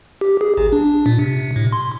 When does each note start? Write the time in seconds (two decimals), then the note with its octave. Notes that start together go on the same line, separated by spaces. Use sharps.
0.21 G4
0.41 G#4
0.57 A1
0.72 D4
1.06 A#2
1.19 C3
1.56 A2
1.72 C6